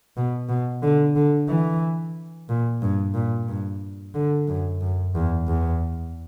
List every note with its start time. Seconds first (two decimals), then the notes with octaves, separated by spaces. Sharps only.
0.17 B2
0.49 B2
0.82 D3
1.16 D3
1.48 E3
2.49 A#2
2.82 G2
3.14 A#2
3.48 G2
4.14 D3
4.48 F#2
4.81 F#2
5.15 E2
5.47 E2